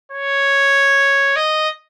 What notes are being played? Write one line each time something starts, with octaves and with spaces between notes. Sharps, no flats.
C#5
D#5